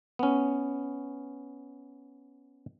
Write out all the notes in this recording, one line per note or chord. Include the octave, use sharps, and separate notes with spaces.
B3 C#4